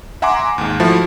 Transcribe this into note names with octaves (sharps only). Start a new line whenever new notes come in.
E5 F#5 G#5 A#5 C6 D6
D#2 G#2
F3 A3 E4 F#4